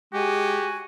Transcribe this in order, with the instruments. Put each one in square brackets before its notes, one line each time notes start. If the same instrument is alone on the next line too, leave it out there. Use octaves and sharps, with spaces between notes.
[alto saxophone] G#3 [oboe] F#4 [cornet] G4 [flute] G#5